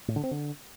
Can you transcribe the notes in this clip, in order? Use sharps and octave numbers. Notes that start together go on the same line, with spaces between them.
A2
D3
C4
D3